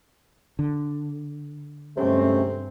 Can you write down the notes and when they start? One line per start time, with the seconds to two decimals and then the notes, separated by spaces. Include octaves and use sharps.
0.59 D3
1.97 G2 C3 G#3 A3 C4 C#4